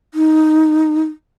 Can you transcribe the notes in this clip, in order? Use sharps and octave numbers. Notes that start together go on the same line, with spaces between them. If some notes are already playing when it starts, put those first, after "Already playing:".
D#4